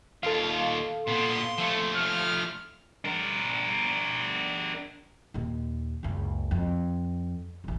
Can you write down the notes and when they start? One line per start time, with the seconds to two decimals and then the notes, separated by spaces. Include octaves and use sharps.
0.23 D#2 F4 A4 F5
1.07 A#2 B3 C6
1.58 F3 A3
1.96 F6
3.05 D4 A#4
5.34 D#2 A#2
6.03 F#1 C#2
6.51 F2
7.64 E1 A1